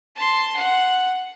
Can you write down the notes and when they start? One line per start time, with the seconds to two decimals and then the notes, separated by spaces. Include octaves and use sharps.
0.16 A5 C6
0.56 F#5